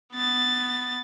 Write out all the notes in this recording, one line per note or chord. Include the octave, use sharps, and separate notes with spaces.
B3 A6